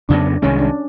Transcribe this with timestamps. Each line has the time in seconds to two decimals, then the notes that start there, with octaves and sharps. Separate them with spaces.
0.09 F2 C#3 F#3 B3 D4
0.42 C2 C3 D#3 G#3 C#4
0.59 D4